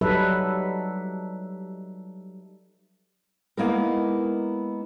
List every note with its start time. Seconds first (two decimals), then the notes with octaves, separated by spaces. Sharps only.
0.01 F#3 G3 D#4 A4 B4 E5
3.57 G#3 A#3 B3 D#4 E4 A#4